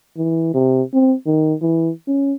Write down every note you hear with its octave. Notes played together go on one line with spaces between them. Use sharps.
E3
C3
C4
D#3
E3
C#4